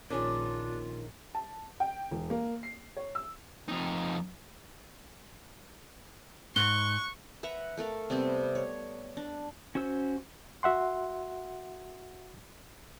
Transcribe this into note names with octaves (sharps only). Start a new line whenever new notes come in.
A#1 D#3 C#4 D4 F4 G#4
A5
G5
E1
A#3
C7
C#5
E6
F2 D#4
G#2 C#6 F#6 G7
B4 E5 F#5 A#5
A3 A4 A#4 F5
C3 G3 B3 C4
C#5
D4
C#4 F#4 C5 E6
F#4 E5 F#5 C6